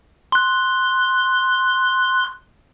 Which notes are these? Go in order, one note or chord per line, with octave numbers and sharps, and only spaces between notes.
C6 F#6